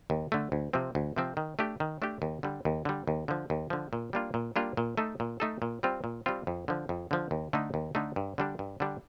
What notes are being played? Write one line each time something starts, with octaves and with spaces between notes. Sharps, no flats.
D#2
D3 A3
D2
C3 F3 C4
D2
C3 F3 C4
D#3
A3 D4 G4
D#3
A3 D4 G4
D#2
D3 G3
D#2
D3 G3
D#2
D3 F3
D#2
D3 F3
A#2
G3 A#3 D4 F4
A#2
G3 A#3 D4 F4
A#2
A3 D#4 A4
A#2
A3 D#4 A4
A#2
G3 C4 F4
A#2
G3 C4 F4
F2
D3 F3
F2
D3 F3
D#2
D3 A3 D#4
D#2
D3 A3 D#4
G2
D3 G3 D4
G2
D3 G3 D4